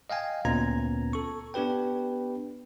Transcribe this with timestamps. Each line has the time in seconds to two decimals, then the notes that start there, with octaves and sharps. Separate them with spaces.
0.10 D#5 F5 G5 G#5
0.45 D2 A#2 B3 C#4 A#5 G#6
1.13 A4 C#6
1.54 B3 D4 G4 B4 G5